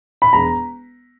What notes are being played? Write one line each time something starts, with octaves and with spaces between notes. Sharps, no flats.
B5
E1 A#5